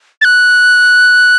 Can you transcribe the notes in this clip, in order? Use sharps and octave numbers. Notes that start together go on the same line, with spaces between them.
A6
F#6